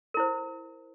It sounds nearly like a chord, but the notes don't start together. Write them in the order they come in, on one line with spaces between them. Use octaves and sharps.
A#4 E4 C5